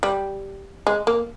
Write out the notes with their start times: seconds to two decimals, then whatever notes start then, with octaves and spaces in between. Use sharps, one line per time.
0.03 G3
0.87 G#3
1.07 A#3